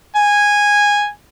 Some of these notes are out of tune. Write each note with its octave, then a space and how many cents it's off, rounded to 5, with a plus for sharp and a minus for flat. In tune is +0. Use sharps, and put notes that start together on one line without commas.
G#5 -10